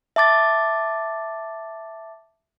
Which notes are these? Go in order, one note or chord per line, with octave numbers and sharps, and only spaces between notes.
E5 A5 D6 A6